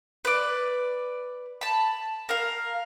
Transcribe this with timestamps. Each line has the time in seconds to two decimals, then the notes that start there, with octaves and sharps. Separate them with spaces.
0.25 B4 D5
1.61 A5 B5
2.29 A#4 F5